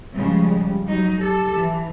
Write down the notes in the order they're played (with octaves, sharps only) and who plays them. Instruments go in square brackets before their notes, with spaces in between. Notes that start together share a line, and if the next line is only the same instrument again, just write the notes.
[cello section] C#3 F3 G#3 [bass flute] G3
[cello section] F#3 D#4
[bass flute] G4 [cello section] A4
[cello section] E3